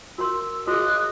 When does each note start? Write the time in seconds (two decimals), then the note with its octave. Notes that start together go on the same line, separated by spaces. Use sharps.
0.18 F#4 A#4 C6 E6
0.68 F#4 G#4 D#5 F#6